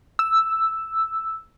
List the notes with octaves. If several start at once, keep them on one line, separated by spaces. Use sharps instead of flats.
E6